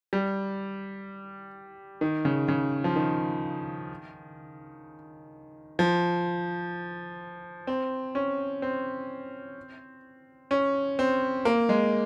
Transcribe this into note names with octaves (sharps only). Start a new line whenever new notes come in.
G3
D#3
C#3
C#3
F3
D#3
F3
C4
C#4
C4
C#4
C4
A#3
G#3